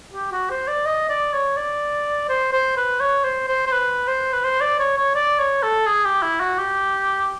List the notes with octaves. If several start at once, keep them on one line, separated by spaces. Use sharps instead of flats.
G4
F#4
C5
D5
D#5
D5
C#5
D5
C5
C5
B4
C#5
C5
C5
C5
B4
C5
B4
C5
D5
C#5
C#5
D5
C#5
A4
G#4
G4
E4
F#4
G4